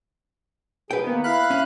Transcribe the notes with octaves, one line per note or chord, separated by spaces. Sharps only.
F#3 G#4 B4 G5
D#3 A#3 B3
E4 F5 B5 F#6
C#4